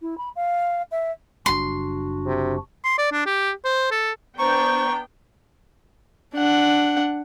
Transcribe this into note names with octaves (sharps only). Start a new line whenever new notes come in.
E4
B5
F5
E5
F#1 G3 D4 F#4 C6
C3
C6
D5
D4
G4
C5
A4
B3 D4 C5 G5 A#5 C#6
D4 F#5